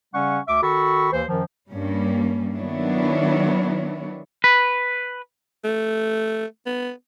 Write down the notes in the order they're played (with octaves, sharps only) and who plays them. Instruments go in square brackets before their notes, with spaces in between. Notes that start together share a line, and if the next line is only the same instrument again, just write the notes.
[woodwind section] C#3 G3 C#4 F#5 C#6
D2 E5 D6
D#3 F#4 A4 B5 C#6
D#2 E3 C5
F#2 D#3 F3
[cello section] G2 G3 A#3 C#4
D#3 F#3 B3 D4 E4 C#5
[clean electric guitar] B4
[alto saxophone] A3
B3